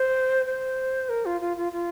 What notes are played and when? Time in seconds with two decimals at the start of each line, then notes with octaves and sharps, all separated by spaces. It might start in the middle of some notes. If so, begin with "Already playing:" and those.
Already playing: C5
0.46 C5
1.09 A#4
1.26 F4
1.41 F4
1.57 F4
1.72 F4